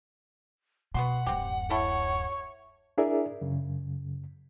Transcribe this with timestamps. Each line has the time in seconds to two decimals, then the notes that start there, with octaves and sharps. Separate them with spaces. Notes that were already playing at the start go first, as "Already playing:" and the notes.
0.94 B2 B3 F#4 F#5 C6
1.26 D1 F#2 C4 G4
1.71 E4 A4 C#5
2.98 D4 E4 G#4 A#4 D5 E5
3.41 F#2 C#3